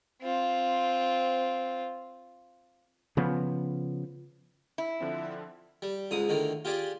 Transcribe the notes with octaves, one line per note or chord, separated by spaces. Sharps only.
C4 F4
C#3 F3 B3
E4
D3 F3 C4
G3
C#2 G#2 D#6
A2 D3 D#3
F4 G4 G#4 D5